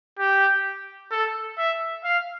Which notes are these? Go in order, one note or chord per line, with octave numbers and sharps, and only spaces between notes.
G4
A4
E5
F5